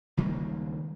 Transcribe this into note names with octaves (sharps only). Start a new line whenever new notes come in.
C#2 D#3 G3 A#3